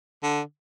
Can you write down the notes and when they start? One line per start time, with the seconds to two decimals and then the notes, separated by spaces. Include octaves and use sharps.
0.23 D3